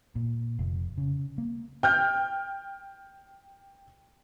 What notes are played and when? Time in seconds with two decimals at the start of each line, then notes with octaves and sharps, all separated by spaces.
0.16 A#2
0.59 F1
0.98 C#3
1.38 A#3
1.83 G5 F6 G6